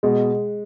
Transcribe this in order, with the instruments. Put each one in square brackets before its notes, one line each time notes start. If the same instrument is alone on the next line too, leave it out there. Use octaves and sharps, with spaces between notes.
[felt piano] B2 [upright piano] G#3